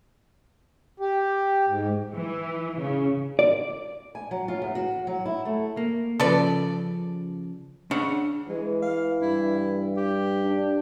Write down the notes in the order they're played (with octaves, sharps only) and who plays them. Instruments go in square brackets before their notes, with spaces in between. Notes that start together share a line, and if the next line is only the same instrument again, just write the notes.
[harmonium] G4
G#2
[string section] E3
C#3
[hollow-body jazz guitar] D5
[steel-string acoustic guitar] G#5
F#3
F4
E2
F#4
F#3
E4
A3
[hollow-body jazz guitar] A#3
[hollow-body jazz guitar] C#3 F3 [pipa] A4 B4 D5
[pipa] C#3 [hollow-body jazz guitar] D4 F#5
[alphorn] E3 [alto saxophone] G#3
[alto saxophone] F5
[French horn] G2 [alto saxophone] E4
[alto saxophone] G4
[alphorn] D4